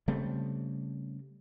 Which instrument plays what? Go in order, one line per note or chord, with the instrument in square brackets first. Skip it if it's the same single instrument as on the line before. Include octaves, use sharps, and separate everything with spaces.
[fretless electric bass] C#3 G3 A3 C4